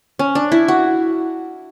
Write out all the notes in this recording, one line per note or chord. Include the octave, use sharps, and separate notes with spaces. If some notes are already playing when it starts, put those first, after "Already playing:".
C#4
D4
E4
F#4